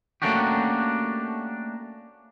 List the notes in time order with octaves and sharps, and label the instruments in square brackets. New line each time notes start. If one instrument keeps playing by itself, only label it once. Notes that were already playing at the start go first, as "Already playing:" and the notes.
[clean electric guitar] A3 A#3 C#4 D4 F#4 G4